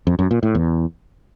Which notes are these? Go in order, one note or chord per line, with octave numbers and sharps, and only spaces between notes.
F2
F#2
A#2
A2
E2